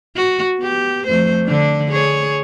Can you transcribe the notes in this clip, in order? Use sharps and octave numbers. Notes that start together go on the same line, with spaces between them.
F#4
B3 G4
F2 A3 C5
D3 D4
G#4 C#5